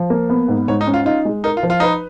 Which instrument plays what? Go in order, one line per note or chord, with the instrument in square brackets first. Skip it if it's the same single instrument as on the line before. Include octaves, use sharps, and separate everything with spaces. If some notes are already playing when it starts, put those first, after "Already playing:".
Already playing: [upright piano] F3
A#3
B3
G#2
[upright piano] G#2 [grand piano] C#5
[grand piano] D#4
[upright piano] C#4
[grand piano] F4
[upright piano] D#4 [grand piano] F4
[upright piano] G#3
[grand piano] D#4 [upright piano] A#4
[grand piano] F4
[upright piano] F3
[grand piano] F4
[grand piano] D#4 [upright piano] B4